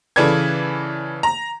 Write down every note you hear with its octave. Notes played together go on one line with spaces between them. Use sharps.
C#3 E3 A4 B4 D5 G#6
A#5